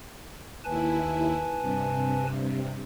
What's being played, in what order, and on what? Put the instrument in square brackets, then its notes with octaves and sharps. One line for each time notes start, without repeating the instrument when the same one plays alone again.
[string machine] D#2 E4 [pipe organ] B4 G#5 A5
[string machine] G2 C3